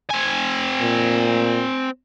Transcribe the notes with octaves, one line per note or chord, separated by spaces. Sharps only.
C4 G#5
A#2